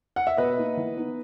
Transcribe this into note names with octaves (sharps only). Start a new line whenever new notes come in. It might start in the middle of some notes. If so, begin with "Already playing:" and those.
F#5
E5
B2 B4 D#5
A#3 D#4
E3
B3 D#4